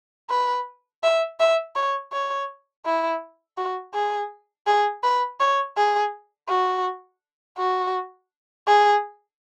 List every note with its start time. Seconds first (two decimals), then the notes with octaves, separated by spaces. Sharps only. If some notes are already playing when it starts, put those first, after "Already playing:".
0.30 B4
1.03 E5
1.40 E5
1.76 C#5
2.13 C#5
2.85 E4
3.57 F#4
3.94 G#4
4.67 G#4
5.04 B4
5.40 C#5
5.77 G#4
6.49 F#4
7.58 F#4
8.67 G#4